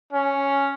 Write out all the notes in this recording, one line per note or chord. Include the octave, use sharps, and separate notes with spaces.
C#4